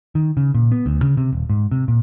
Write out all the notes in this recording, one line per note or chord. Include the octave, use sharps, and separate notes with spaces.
D#3
C#3
A#2
B3
D2
C#3
C3
D#1
G#2
C3
A#2